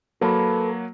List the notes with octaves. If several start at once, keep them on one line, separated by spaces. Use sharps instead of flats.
F#3 A#3 A4 B4